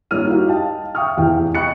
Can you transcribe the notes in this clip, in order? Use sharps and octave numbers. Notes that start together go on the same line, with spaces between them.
G2 G3 A#3 C#5 F6 D#7
D#4 E4 F#4 G4 F5
D#5 F5 G5 A5
E5 F5 G5 C#6 D#6 F6
F1 E2 E3 G4 F5 G5
D#5 G5 B5 C#6 F#6 C#7